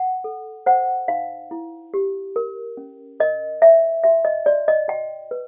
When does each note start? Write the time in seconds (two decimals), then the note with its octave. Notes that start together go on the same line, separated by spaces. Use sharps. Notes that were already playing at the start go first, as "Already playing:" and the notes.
Already playing: F#5
0.24 A4
0.66 C5 F#5
1.08 D#4 F5
1.51 E4
1.94 G4
2.36 A#4
2.77 C#4
3.20 A#4 D#5
3.62 C#5 E5
4.04 F#4 E5
4.25 D#5
4.46 F#4 D5
4.68 D#5
4.88 F#4 G5
5.31 B4